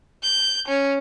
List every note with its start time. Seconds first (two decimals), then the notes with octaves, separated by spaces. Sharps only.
0.23 G6
0.68 C#4